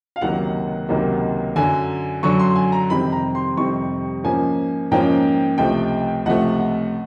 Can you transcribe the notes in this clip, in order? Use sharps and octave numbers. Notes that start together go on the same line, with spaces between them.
F5
C#2 C3 D#3 F#3 A#3 F#5
C#2 C3 D#3 F#3 A#3
F#2 D3 F#3 G#5
F#2 D3 F#3 C#6
C6
G#5
A#5
F2 C3 D#3 G3 C4 B5
A#5
C6
F2 C3 D#3 G3 C4 C#6
G#2 F3 A#3 C#4 G#5
G#2 F3 A#3 C#4 G5
C#2 C3 F3 A3 G5
C#2 C3 F3 A3 F#5
F#5